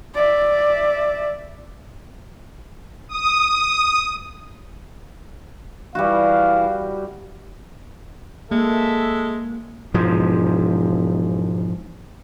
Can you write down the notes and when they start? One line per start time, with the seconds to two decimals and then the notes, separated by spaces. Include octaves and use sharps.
0.14 D5 E5
3.08 D#6
5.95 E3 G3 E4 F#4 F5
8.51 G#3 A#3 A4 E5
9.94 E1 G#2 F3